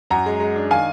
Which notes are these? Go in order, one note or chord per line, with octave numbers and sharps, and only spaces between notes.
F#2 F#5 A#5
G#3
G#3
D4
D#3 F5 G#5